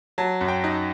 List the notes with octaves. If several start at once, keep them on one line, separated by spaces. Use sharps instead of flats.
F#3 A5
F#2
G5
D#4